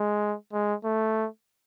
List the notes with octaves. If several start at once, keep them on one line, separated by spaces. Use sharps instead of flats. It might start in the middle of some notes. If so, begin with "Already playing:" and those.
Already playing: G#3
G#3
A3